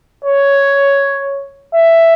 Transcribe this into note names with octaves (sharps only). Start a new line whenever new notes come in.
C#5
E5